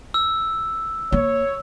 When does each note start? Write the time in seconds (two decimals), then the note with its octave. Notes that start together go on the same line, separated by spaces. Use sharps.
0.14 E6
1.12 A#3 C#5